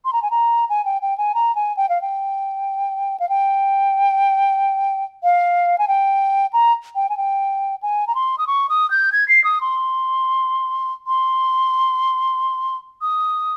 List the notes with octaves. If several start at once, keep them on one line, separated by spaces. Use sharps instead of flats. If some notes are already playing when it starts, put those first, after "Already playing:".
C6
A#5
G#5
A#5
G#5
G5
G5
G#5
A#5
G#5
G5
F5
G5
F5
G5
F5
G#5
G5
A#5
G5
G#5
G5
G#5
A#5
C6
D#6
C#6
D#6
G6
G#6
C7
D#6
C6
C6
D#6